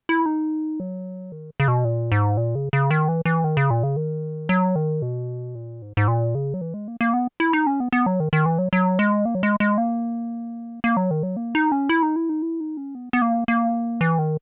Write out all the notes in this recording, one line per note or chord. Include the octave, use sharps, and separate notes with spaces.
E4
D#4
F#3
D#3
C#3
B2
A#2
G#2
A#2
C#3
C#3
D#3
E3
E3
D#3
C#3
A#2
C#3
D#3
F#3
D#3
B2
A#2
G#2
G#2
A#2
C#3
F#3
E3
G#3
A#3
A#3
B3
E4
D#4
C#4
B3
B3
F#3
D#3
D#3
E3
F#3
F#3
G#3
A#3
F#3
G#3
G#3
A#3
A#3
F#3
D#3
F#3
A#3
D#4
C#4
E4
D#4
E4
D#4
E4
D#4
C#4
B3
B3
A#3
A#3
E3
D#3